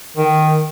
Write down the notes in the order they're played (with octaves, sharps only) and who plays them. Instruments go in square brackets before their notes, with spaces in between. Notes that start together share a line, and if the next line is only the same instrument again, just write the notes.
[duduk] D#3